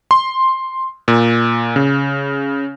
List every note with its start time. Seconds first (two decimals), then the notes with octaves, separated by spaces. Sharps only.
0.11 C6
1.08 A#2
1.76 C#3